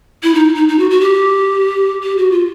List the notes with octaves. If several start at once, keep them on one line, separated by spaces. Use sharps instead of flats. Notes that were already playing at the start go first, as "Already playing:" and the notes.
E4
D#4
D#4
D#4
F#4
F#4
G4
G4
F#4
F4